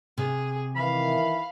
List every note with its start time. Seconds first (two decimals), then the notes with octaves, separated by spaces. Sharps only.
0.18 C3 G#4
0.76 D#3 E3 F5 B5